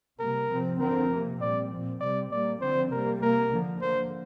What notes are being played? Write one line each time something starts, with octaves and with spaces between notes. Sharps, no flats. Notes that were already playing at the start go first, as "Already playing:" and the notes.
C3 G3 A#3 A#4
C3 F3 C4
D3 F3 C4 A#4
C3 A#3
A#2 G3 C4 D5
A#2 F3 C4
C3 G3 C4 D5
A#2 G3 A#3 D5
D3 F3 C4 C5
C3 G3 A#3 A#4
C3 A#3 A#4
D3 F3 A#3
D3 A#3 C5